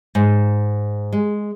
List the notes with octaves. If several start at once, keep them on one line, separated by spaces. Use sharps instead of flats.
G#2
G#3